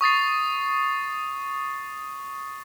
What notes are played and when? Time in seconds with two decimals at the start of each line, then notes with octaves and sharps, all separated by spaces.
0.01 C#6 D#6 A6 C7